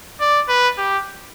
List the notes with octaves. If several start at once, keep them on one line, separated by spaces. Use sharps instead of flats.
D5
B4
G4